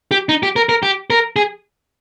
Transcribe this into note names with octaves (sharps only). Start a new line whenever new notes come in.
G4
D#4
G4
A#4
A#4
G4
A#4
G#4